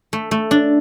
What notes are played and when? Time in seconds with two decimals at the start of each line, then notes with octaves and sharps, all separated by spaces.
0.13 A3
0.31 A3
0.51 D4